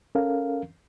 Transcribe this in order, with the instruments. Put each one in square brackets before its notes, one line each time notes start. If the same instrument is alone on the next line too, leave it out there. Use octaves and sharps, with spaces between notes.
[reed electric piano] C#4 A4 A#4 F5